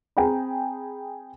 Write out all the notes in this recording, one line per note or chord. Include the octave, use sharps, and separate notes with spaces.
C4 G#4 G5 G#5 A#5 B5